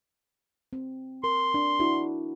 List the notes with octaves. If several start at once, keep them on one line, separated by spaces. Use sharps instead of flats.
C4
A#4 C6
D4
D4 E4 F#4